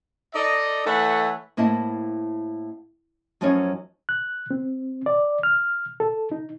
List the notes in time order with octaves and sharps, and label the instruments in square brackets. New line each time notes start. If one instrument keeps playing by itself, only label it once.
[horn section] D#4 A4 D5 D#5
E3 A3 C#5 E5 F#5 A5
[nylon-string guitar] A2 A#3 C4 E4 D#5 A5
F#2 F3 F#3 C#4 D#4 C#5
[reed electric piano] F#6
C4
D5
F6
A4
D#4